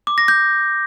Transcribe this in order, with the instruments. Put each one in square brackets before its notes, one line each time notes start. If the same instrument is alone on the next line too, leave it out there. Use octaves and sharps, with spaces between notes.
[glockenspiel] D6
A#6
G6